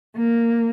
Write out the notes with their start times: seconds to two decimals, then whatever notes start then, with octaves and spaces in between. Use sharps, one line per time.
0.16 A#3